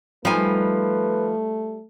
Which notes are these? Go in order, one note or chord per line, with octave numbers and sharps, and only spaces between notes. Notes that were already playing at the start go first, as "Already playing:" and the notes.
F3 G3 A3 D#4 B4 G#5